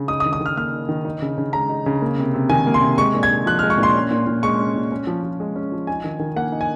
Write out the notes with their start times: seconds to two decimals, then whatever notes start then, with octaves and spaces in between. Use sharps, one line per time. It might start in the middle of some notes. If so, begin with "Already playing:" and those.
Already playing: C#3
0.08 D#4 D#6
0.20 D#6
0.25 D#3
0.33 D#6
0.41 D#3
0.46 F6
0.57 A#3 F6
0.73 D#4
0.89 D#3
1.05 D#4
1.22 C#3
1.38 C#3
1.53 G#3 A#5
1.69 D#4
1.86 C#3
2.02 A#3
2.18 C3
2.34 C3
2.49 D#3 G#5
2.67 A#3
2.74 C6
2.82 C3
2.98 G#3 C#6
3.14 A#2
3.23 G#6
3.31 D#4
3.46 F3 F#6
3.59 F6
3.63 G#3
3.70 C#6
3.78 A#2 C6
3.94 C#4
4.11 A#2
4.27 A#2
4.43 G#3 C#6
4.60 C#4
4.76 A#2
4.92 C#4
5.07 F3
5.24 F3
5.40 G#3
5.56 C#4
5.72 F3
5.87 D#4 G#5
6.04 D#3
6.19 D#3
6.36 A#3 F#5
6.52 D#4
6.61 G#5